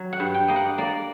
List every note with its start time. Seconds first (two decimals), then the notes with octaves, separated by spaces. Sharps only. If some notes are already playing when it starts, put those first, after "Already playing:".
Already playing: F#3
0.13 F#5
0.20 G2
0.34 G5
0.48 A#3 D#5
0.56 F#5
0.78 A#3 D5